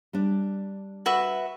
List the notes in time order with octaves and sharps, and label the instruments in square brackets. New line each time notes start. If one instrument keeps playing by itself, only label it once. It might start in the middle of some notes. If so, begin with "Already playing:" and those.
[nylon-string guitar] G3 D4
[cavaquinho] F#4 B4 E5